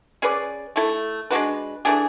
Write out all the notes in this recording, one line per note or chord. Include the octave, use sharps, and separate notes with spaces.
C#4 G#4 B4 D5
A3 E4 A4
G#3 D4 F#4 B4
E3 A3 D4 G#4